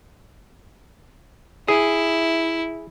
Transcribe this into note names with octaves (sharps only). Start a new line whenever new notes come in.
E4 G#4